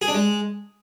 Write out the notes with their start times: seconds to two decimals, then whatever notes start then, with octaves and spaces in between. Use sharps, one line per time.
0.02 G#4
0.08 D4
0.15 G#3